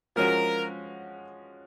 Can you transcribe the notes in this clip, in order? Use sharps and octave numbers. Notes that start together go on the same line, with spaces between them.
F3 G#3 C#4 F#4 A#4